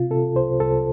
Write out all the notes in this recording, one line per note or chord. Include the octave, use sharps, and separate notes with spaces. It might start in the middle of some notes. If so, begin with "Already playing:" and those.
Already playing: C3 F4
C3 A4
C2 C5
C2 A4